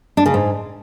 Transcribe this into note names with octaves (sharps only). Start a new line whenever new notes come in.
D4
C#3
G#2